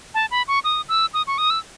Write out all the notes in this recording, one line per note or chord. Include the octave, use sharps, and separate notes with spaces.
A5
B5
C#6
D#6
E6
D#6
C#6
D#6
E6